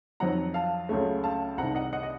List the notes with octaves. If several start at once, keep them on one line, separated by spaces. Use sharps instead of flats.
F2 D#3 F#3 C4 F#5 A#5
F5 A5
C#2 C#3 F#3 A3
F5 A5
C2 C3 D#3 F#5 A#5
D#5 F#5
D#5 F#5
D#5